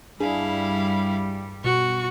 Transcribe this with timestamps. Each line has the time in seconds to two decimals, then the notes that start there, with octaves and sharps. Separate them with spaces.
0.20 G2 G3 D4 E4 G#4 F5
1.64 B2 F#4 C#6